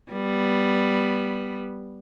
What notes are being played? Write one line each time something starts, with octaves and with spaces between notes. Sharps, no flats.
G3 B3